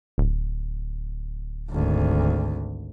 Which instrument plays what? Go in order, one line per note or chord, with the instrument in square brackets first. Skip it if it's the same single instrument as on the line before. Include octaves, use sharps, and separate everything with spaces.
[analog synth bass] D1
[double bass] G#1 D2